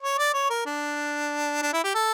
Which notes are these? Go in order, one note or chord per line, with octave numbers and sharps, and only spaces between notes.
C#5
D5
C#5
A#4
D4
D4
E4
G4
A4